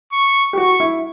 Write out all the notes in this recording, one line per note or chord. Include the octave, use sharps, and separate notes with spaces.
C#6
G4
F#4 C#6
E4